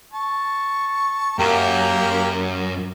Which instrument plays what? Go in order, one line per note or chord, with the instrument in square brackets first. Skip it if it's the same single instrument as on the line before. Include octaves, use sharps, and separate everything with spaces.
[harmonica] A5 C#6
[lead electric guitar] F#2 [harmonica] A#3 G4 A#4